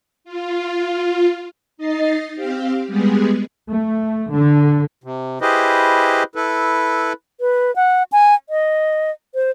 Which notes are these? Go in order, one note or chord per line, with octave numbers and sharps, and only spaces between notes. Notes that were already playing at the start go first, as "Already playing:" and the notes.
F4
D#4 D#5 A6 C7
C4 G4 F5
G3 G#3 B3 G#4
A3
D3
C3
E4 G4 G#4 B4 C5 D#5
E4 A4 B4
B4
F#5
G#5
D#5
C5